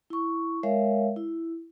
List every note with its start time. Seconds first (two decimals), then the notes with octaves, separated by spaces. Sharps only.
0.10 E4 C#6
0.63 G#3 A#4 C#5 E5 F5
1.16 E4